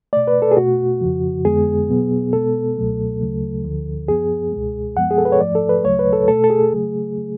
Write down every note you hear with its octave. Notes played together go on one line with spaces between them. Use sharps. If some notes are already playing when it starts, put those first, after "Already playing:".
B2 A3 D5
B4
A4
G#4
B2 A3 F#4
F2 C#3 F3
F2 D3 G#3 B3 G#4
B2 F#3 B3
B2 G#3 B3 A4
C#2 B2 F#3 A3
D2 C#3 F#3 A3
D2 D3 F3
F#2 F3 B3 G#4
C#2 B2 G#3
F#2 F3 G#3 B3 F#5
G#4
A4
B4
C#5
G#2 F3 A3 D5
A4
B4
D2 C#3 F#3 A3 C#5
B4
A4
B2 A3 A4
A4
G#4
C#3 F#3 A3